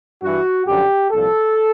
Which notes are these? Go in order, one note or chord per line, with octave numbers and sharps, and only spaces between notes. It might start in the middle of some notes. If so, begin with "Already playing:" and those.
G2 E3 F#4
F#2 D3 F3 G4
C2 A#2 F3 A4